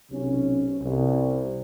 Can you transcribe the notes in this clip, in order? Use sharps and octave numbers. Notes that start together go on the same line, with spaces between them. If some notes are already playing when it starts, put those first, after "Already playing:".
B1 C3 C#4
C2